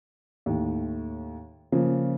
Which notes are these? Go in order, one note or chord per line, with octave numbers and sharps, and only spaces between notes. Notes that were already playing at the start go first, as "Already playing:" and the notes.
D#2 A2
C#3 F3 A#3